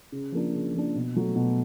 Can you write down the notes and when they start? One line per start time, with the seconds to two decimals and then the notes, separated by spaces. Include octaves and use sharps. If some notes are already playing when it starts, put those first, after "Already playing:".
0.12 C#3
0.32 F3 A#3 D4
0.52 C#3
0.74 F3 A#3 D4
0.95 B2
1.16 F#3 A3
1.36 B2